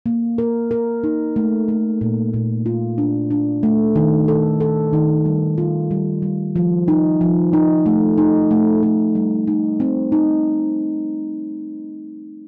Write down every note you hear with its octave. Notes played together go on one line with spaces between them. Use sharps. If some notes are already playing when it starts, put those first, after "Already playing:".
A#3
A#4
A#4
D#4
A3
A3
A#2
A#2
F4
D4
D4
A3
D#3
A4
A4
D#3
G3
F4
G3
G3
F3
D#4
F3
D#4
A3
D#4
A3
A3
G3
D#4
C4
D#4